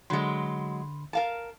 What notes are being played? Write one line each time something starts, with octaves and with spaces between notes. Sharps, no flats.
D3 F#3 G#3 B5 C6
A#4 F5 A5